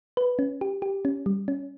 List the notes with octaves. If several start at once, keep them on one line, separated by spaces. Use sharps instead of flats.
B4
C#4
G4
G4
C#4
G3
C#4